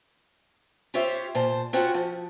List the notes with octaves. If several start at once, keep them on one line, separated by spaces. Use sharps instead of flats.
F4 G4 C5 C#5 E5
A#2 C5 A5
C4 C#4 F4 F#4 C5
F3